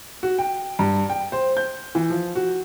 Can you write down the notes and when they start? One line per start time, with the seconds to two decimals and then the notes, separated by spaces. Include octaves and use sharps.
0.23 F#4
0.38 G5
0.79 G2
1.09 G5
1.32 C5
1.57 G6
1.95 E3
2.10 F3
2.35 F#4